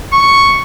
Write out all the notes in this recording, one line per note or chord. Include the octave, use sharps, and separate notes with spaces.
C#6